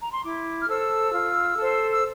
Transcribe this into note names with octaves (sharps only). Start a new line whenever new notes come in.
A#5
C6
E4 D6
F6
A4 C5 E6
F4
A4 C5
E6